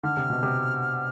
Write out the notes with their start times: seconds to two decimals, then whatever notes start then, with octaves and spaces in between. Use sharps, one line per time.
0.03 D3 F6
0.17 C3
0.30 B2
0.43 C3